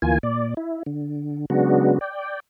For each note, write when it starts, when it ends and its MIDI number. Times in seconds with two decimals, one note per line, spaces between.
0.02 0.18 38
0.02 0.18 52
0.02 0.18 58
0.02 0.18 65
0.02 0.18 80
0.23 0.54 46
0.23 0.54 74
0.57 0.83 64
0.86 1.46 50
1.50 1.99 49
1.50 1.99 54
1.50 1.99 56
1.50 1.99 59
1.50 1.99 62
1.50 1.99 66
2.01 2.40 74
2.01 2.40 79